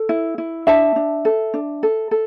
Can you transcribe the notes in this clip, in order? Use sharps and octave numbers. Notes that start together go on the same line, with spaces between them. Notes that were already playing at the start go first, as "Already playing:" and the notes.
Already playing: A4
E4
E4
D4 E5 A5
D4
A4
D4
A4
A4